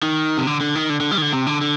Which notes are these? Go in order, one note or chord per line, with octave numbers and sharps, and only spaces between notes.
D#3
C3
D3
D3
D#3
D3
D3
G3
D#3
D3
C3
D3
D3